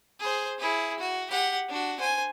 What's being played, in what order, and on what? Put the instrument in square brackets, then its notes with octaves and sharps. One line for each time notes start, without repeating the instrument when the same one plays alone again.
[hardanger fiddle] G#4 C5
E4 G#4
F#4
G4 F#5
D4 F#4
C5 G#5